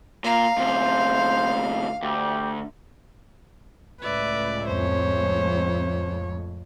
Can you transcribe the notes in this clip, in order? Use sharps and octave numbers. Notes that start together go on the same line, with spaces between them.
A#2 F5 A#5
D2 C3 C5
D2 G4
C#2 A2 B4 D5 E5
F2 C5 C#5